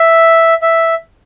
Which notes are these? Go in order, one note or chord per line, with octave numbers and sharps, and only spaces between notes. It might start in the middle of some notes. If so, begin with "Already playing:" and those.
Already playing: E5
E5